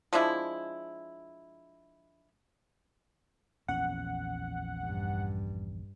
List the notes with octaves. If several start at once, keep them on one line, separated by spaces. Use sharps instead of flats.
F3 G#3 D4 E4
A#1 E2 C#4 F#5
G2